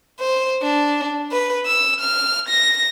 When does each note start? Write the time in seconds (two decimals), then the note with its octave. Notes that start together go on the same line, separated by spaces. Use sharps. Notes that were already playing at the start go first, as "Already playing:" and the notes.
0.20 C5
0.62 D4
1.32 B4
1.66 E6
2.01 F6
2.49 A#6